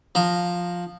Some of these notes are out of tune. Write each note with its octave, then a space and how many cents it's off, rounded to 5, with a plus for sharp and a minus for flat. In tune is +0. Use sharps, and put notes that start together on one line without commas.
F3 +10 A#5 +0